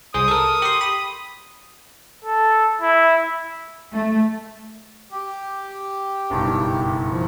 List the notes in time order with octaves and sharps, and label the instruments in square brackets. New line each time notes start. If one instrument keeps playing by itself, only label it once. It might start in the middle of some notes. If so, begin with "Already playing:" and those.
[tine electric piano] C2 G#4 C5 [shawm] D#6
[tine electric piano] A4 A#4
G4 C6
B5
[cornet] A4
E4
[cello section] A3
[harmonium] G4
[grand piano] F#1 B1 G2
[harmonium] F3